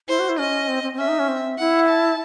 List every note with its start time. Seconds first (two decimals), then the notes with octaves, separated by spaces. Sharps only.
0.08 E4 C5
0.19 F#4
0.29 E4
0.38 C#4 D#5
0.68 C4
0.83 C4
0.93 C4
0.98 C#4 E5
1.08 D#4
1.19 C#4
1.28 C4
1.58 E4 F#5
1.88 A5